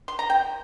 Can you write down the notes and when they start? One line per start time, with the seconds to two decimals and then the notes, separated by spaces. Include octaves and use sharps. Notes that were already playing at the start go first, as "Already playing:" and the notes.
0.08 C6
0.19 A#5
0.30 G5